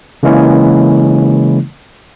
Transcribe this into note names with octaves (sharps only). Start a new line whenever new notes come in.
C#3 E3 G#3 A#3 C#4 E4